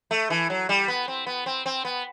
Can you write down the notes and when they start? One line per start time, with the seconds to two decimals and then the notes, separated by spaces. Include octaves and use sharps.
0.11 A3
0.30 E3
0.50 F#3
0.69 G3
0.88 B3
1.08 C4
1.26 B3
1.46 C4
1.66 C4
1.85 B3